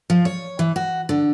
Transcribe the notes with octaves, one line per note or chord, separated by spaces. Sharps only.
F3
C#5
E3
F#4
D3